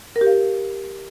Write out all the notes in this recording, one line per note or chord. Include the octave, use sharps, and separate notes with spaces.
A#4
G4
F5